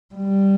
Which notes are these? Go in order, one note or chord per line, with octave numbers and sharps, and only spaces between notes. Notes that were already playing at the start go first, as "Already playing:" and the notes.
G3